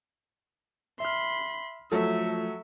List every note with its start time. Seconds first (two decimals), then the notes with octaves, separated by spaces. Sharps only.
1.00 E5 B5 C6 F6
1.92 F3 F#3 A3 A4 E5